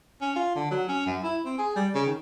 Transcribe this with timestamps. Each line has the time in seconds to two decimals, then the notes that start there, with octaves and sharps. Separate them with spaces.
0.21 C#4
0.36 F4
0.56 D3
0.71 F#3
0.89 C#4
1.06 F#2
1.23 E4
1.45 C4
1.58 G#4
1.76 G3
1.95 C#3
2.06 D#3